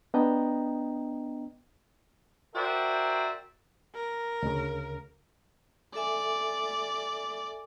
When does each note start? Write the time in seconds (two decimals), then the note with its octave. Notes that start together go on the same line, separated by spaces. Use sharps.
0.14 B3 D4 D#5 G5 A#5
2.54 F#4 A#4 C5 D5 E5 G5
3.95 A#4
4.43 D2 C#3
5.95 A4 D5 E5 G#5